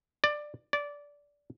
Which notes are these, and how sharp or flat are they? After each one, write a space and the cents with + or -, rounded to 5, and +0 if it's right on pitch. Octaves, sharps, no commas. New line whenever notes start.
D5 +15
D5 -15